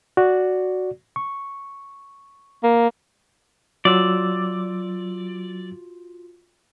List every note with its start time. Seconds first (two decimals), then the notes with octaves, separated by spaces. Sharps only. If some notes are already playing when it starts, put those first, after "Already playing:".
0.17 F#4 D5
1.16 C#6
2.63 A#3
3.85 F#3 F4 F#4 D5 C6 E6